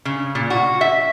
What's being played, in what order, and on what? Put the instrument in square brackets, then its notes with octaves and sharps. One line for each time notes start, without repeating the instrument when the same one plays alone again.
[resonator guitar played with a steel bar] C#3
A#2
F#4
E5